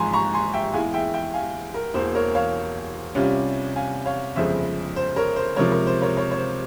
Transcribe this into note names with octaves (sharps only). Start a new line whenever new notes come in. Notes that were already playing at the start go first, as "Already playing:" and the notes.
Already playing: G#1 G#2 F3 G#5 A#5 C6
A#5 C#6
G#5 C6
E5 G5
E2 E3 G#3 E4 F5 G#5
E5 G5
E5 G5
F5 G#5
A#4
E1 E2 E3 A#3 C5
A#4 C#5
C#5 F5
C2 C3 G3 C#4 F4
F5 G#5
C#5 F5
G1 F2 C#3 F3 G#3 C5 E5
C5
A#4 C#5
C5
C#2 C3 F3 A#4 C#5
A#4
C5
A#4 C#5
A#4 C#5
C#5
C5